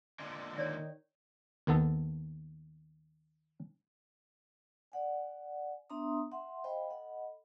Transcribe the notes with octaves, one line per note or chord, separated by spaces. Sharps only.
A#2 D3 G#3
D#3 C#5 D5 E5
D#2 D#3 B3 A4
D5 F#5 G#5
B3 D4 E5 A#5 C6 D#6
E5 F#5 C6
C5 D#5 F5 G5 B5
A4 D#5 F#5 B5